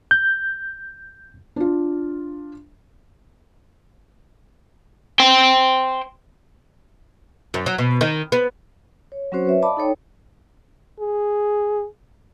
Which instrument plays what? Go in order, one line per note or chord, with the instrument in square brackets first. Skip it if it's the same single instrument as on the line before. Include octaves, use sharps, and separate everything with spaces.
[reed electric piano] G6
[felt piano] D4 F4
[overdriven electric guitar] C5 G5
[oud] F#2
F#3
B2
D#3
B3
[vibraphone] C#5
F#3 C4 C#4 F#4 C5 C#5
B4 C#5 E5
D5 D#5 F5 A5 B5 D6
D#4 A4 C#5 G5
[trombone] G#4